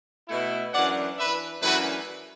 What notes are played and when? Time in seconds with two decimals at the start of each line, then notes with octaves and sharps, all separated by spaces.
0.28 B2 A3 E4
0.73 F#2 E3 D4 D5 F#5
1.17 E3 D4 B4 E5
1.62 F#2 E3 A3 D4 F#4 B4